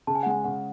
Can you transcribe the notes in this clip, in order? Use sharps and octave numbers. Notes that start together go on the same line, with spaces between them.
C#3 A5
G#5
F#5
G#3 G#5
C#3 F#5